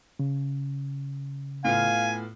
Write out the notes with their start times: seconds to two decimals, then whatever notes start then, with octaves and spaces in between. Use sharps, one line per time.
0.19 C#3
1.64 A2 B3 F4 F5 G#5